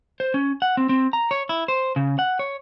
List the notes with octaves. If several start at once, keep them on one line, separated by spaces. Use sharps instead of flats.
C5
C#4
F#5
C4
C4
A#5
C#5
E4
C5
C#3
F#5
C#5